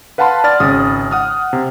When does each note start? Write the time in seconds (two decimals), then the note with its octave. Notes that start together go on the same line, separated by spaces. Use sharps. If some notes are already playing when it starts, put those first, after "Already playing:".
0.18 B4 F5 F#5 A5 B5 C6
0.44 D5 F6 A6
0.60 G#1 C#3 D#6
1.11 F#5 D#6 F6
1.53 C3